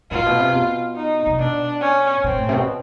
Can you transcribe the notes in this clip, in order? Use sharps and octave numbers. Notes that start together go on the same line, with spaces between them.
A2 F4
B2
C3
B2
D#4
C3
B2 D4
C#4
A#2 C4
A2
C3
B2